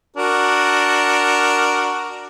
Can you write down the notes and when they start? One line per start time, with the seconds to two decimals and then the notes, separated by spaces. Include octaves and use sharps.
0.16 D4 F#4 A#4